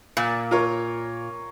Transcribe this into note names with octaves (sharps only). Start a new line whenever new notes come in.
A#2
F4 A#4 C#5